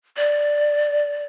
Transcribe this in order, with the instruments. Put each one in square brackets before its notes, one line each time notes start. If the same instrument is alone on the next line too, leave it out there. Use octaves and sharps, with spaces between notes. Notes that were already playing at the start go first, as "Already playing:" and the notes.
[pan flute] D5